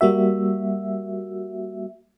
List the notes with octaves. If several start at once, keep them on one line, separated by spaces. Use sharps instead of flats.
G3 A#3 F#4 E5